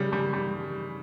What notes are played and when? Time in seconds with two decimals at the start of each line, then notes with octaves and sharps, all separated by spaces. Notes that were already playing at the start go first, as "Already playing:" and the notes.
Already playing: C#3 G3
0.13 G3
0.33 G3